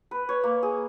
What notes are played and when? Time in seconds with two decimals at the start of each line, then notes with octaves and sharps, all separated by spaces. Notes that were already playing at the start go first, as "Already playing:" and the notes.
0.11 B4
0.29 C#5
0.44 A#3
0.63 G#4